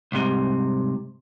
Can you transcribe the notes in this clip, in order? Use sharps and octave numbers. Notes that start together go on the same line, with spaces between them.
C2 G#2 C3